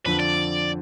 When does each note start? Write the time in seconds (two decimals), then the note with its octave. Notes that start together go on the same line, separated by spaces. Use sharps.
0.05 F2 D3 F3 B4
0.20 D5